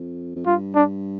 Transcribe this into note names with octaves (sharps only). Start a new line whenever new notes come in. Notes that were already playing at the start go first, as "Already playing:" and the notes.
Already playing: F2
F2
G2 F4
D4